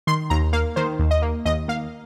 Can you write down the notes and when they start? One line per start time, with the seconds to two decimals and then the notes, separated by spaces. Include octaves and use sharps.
0.07 D#3 C6
0.30 D#2 A#5
0.53 A#3 F5
0.76 D#3 C5
0.99 D#2
1.11 D#5
1.22 A#3
1.45 D#2 D#5
1.68 A#3 F5